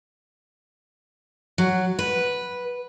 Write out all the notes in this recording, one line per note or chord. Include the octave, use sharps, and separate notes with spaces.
F#3
B4